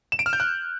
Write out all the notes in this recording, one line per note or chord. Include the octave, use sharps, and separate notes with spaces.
E7
D7
F6
G6
F#6